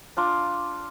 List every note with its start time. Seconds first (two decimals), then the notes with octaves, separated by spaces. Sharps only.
0.17 D4 F4 A#5 D6